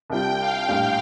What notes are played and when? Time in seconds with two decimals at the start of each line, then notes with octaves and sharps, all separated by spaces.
0.10 C2 C3 G3 D4 F4 G5
0.40 F5
0.68 A#1 A2 G3